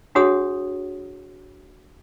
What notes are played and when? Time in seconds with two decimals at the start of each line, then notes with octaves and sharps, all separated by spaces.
0.15 D4 F#4 G#4 C#5 F#5 D#6